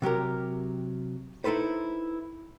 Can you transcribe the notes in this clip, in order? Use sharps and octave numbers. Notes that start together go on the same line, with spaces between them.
C3 F#3 G4 A#4
D#4 E4 A4 B4 C5